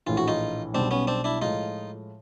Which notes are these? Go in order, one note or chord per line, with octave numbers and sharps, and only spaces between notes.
A#1 A2 E3 F4
F#4
D#4 F4
B1 B2 G3 C4 D4
B3 C#4
C4 D4
D4 E4
A2 F3 G#3 D#4 F4